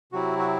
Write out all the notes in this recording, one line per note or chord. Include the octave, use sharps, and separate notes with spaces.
C3 F#3 C4 E4 F#4
F#4